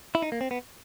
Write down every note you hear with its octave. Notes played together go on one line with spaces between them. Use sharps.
E4
D#4
A#3
C4
B3